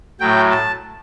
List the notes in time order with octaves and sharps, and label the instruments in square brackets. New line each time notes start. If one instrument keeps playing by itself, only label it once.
[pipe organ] A2 F#3 G5
A5